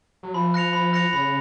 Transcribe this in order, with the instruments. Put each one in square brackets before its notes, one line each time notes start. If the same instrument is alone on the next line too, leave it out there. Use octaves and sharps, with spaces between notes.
[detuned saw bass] F#3
[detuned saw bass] F3 [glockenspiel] B5
[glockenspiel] F#6 A#6 C#7 F7
B5
F#6 A#6 C#7 F7
[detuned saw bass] C#3 [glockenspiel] B5